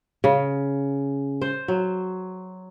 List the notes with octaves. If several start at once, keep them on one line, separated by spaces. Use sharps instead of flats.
C#3
C5
F#3